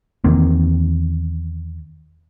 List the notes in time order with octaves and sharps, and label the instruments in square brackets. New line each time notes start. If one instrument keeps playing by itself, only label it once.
[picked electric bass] E2 D#3 A#3 C4